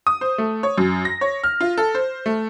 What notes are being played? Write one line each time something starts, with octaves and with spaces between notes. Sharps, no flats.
D#6
C5
A3
C#5
F#2
A#6
C#5
F6
F4
A4
C5
A3